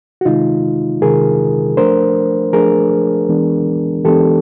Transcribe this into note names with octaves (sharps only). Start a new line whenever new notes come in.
F#4
C3 D#3 G#3 D#4 F4
C3 D#3 G#3 G#4 A#4
F3 A3 D4 A#4 C5
F3 A3 D4 G#4 A#4
E3 G#3 B3 D4
E3 G#3 B3 D4 G4 A4